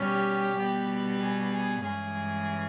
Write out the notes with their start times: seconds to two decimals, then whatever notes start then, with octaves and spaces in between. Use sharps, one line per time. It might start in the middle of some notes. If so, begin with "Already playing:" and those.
Already playing: B2 G3 C#4 G4
0.57 B2 G3 B3
1.20 G#4
1.52 G#4
1.83 G2 E3 G#3 C#4 G#4